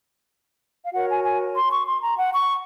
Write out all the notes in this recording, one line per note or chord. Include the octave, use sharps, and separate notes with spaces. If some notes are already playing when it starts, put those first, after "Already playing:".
F5
F#4 A#4 C#5 F#5
G#5
G#5
C6
C#6
C6
A#5
F#5
C#6